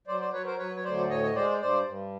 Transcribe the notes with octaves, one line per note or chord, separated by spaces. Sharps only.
F#3 C5 D5
C5 D5
F#3 B4 C#5
A#4 C5
F#3 B4 C#5
C#5
D2 C5 D5
A2 C#5 D#5
D#5
G#3 C5 D5
G2 C5 D5
G2